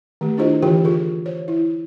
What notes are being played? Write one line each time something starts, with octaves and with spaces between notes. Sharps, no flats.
D#3 A3 G4
D4 E4 F4 G#4 C5 D#5
D3 E3 F4 G4 A#4 G5
F4 G#4 A#4
C5 C#5
E4